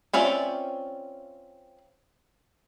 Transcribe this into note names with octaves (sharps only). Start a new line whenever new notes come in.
C4 C#4 F4 D5 E5